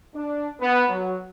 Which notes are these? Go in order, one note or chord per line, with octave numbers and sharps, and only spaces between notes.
D4
B3
F#3